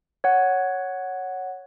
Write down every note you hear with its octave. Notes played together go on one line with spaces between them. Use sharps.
C#5 F#5